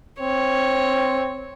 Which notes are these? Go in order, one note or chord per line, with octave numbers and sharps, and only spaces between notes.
C4 C#5